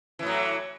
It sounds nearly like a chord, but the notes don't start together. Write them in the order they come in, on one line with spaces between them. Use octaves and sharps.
E3 A2 F#3